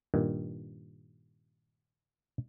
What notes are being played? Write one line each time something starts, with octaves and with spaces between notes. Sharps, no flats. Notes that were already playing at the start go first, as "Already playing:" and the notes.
G2 A#2 D#3